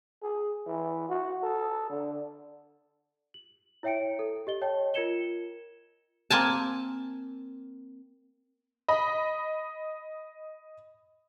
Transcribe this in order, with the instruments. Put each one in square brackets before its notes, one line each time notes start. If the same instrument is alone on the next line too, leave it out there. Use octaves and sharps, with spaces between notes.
[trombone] G#4
E3
F#4
A4
D3
[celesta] F#7
E4 C#5 E5 G5 C#7 D7
A4
G4 D#5 G7
C#5 D#5 G5 A5
F4 A#4 G#6 C#7 E7 G7
[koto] A#3 C4 G#5 A5
[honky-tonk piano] D#5 B5